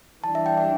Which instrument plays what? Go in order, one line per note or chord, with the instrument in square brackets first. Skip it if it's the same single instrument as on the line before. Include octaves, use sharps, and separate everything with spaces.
[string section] E3 G3 D4 [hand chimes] A5
[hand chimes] E5
G5
E5